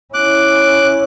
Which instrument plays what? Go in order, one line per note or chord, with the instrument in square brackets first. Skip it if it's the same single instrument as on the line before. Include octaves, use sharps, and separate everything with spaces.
[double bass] C#4 E4 [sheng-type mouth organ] D6 F#6